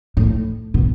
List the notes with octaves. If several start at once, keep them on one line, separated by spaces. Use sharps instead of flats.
A2
B2